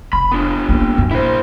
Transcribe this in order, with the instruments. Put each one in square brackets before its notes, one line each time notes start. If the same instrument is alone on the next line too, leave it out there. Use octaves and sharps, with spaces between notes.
[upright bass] F1 [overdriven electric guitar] B5
[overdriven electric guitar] B3 D4
[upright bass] A#3 C#4
F#2
[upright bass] A#1 [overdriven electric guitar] E4 C5